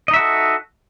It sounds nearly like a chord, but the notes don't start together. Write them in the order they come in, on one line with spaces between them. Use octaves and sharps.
D#5 D#4 E5 F#4 A4